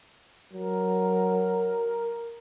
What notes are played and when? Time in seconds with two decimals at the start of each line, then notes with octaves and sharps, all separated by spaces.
0.53 F#3 A#4